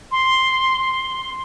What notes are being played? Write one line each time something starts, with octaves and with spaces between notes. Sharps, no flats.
C6
C6